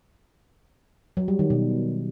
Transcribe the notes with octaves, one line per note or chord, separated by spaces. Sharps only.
F#3
G3
D#3
B2